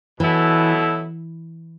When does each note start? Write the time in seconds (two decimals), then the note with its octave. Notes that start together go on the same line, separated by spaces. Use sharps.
0.20 B2 E3 F#3 B3 E4 A4